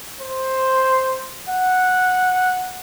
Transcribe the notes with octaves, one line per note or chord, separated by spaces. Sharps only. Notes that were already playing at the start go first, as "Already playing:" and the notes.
C5
F#5